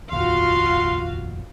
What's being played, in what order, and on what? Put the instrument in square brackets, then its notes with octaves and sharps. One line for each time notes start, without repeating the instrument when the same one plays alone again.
[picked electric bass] F1 A#1 D#2 [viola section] F4 F#4 F5 [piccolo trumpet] C6